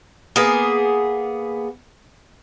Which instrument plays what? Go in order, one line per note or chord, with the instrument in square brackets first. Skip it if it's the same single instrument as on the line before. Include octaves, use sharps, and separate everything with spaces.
[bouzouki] A#3 B3 G#4